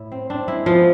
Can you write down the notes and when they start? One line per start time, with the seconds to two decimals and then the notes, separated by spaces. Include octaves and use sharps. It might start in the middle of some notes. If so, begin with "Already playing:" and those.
Already playing: A2 E4
0.12 C4
0.30 C4 D4
0.48 G#3 E4
0.66 F3 B3 F4